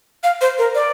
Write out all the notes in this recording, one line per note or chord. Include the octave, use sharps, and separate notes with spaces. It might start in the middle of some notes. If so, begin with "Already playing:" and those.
F5
C5
A#4
D5